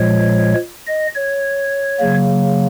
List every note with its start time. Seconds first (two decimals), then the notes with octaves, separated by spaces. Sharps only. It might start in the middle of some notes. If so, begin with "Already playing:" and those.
Already playing: A#2 F3 G#3 C#5
0.88 D#5
1.16 C#5
2.00 C#3 F#3 A#3